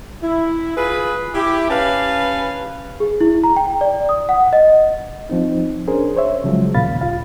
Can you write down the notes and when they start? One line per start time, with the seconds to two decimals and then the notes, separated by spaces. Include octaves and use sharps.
0.23 E4
0.77 F4 G#4 B4
1.35 E4 G4
1.70 C#4 G4 B4 F5 A5
3.00 G#4
3.20 E4
3.44 A#5
3.56 G5
3.81 D5
4.09 D#6
4.29 F#5
4.53 D#5
5.29 F3 C4 D#4
5.87 C#4 D4 G#4 A#4 C5
6.16 C5 C#5 E5
6.44 C#3 F3 F#3 G#3
6.74 D#2 A#2 C#3 F5 B5 A6
7.01 D2 F4 F5